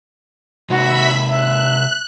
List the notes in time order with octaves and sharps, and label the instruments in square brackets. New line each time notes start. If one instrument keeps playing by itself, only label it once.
[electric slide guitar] C3 G#3 D#4 [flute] F#4 [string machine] E5 B5 B6
[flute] E5 [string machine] F#6